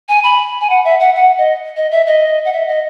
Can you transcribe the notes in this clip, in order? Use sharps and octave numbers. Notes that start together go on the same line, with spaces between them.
G#5
B5
G#5
F#5
E5
F#5
F#5
D#5
D#5
E5
D#5
F#5
E5
D#5